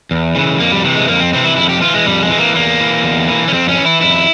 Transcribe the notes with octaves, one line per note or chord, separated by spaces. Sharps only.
E2
C#3 E3
F2 A#3
G3
C3 E3
G#3
F2 A#3
C4
C3 E3 C4
E4
F2 E4
G4
E3 F4
G#3
F2 G3
G#3
E3
A#3
E2 A#3
E3
E2
E3
C#4
F2 C4
C#4
E3
E4
F2 E4